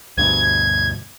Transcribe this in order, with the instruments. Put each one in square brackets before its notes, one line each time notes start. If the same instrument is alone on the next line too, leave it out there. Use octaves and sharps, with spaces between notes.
[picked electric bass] D2 G2 B2 [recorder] G#6